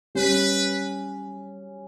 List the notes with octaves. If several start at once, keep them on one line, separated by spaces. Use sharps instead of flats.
G3 C#4 G4 B4